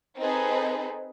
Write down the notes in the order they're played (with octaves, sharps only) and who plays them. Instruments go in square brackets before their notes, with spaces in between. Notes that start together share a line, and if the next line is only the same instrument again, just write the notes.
[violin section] C4 D#4 G#4 A4 B4